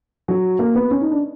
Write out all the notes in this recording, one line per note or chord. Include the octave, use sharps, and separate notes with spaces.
F#3
A#3
B3
C#4
D#4
D4